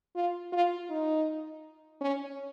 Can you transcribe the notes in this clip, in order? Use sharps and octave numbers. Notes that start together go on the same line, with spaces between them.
F4
F4
D#4
C#4